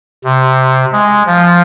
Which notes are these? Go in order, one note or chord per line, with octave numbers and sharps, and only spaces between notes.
C3
G#3
F3